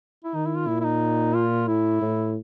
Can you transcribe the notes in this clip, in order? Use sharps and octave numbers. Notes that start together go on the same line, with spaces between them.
E4
D#3 D#4
E4
F4
A#2 E4
E4
D#4
F4
A2 E4
A2